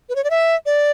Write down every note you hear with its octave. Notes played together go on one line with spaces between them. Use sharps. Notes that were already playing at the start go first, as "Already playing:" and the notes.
B4
C#5
D5
E5
D5